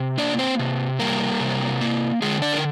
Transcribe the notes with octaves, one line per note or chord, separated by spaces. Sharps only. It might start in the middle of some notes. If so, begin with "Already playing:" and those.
Already playing: C3
A#3 D4 D5
C4 C5
C3
G3 A#3 A#4
C3
A#3
D3 G#3 G#4
D4 D5
A#4